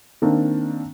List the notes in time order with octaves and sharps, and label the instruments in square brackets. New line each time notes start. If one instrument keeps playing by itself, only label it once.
[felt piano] D#3 A#3 C4 D4